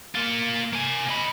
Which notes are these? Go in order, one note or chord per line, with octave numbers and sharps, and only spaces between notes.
A#3 F4
A#3 G#5
D#5 B5